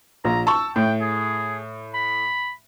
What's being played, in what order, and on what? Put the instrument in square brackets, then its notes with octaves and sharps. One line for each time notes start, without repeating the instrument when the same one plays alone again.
[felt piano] A#1 [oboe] A#5
[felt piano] A5 C#6 [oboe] E6
[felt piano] A2 [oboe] G5
[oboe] G#4
B5